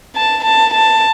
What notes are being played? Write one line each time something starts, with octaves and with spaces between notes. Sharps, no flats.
A5
A5
A5